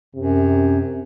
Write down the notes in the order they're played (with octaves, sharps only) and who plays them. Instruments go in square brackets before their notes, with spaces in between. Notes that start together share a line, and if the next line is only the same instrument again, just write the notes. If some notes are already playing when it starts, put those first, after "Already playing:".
[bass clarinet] F#2 [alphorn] C3